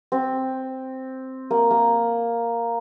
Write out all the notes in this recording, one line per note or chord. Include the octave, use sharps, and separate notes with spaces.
C4
A#3
A#3